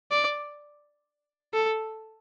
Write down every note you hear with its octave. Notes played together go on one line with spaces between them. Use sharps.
D5
A4